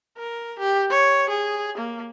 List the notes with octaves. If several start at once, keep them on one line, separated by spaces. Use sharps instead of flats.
A#4
G4
C#5
G#4
A#3